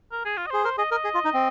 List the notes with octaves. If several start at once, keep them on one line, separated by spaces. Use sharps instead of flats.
A#4
G#4
F4
D#5
G#4 C5
A#4 C5
G#4 D#5
A#4 D#5
G#4
F4
D#4
C4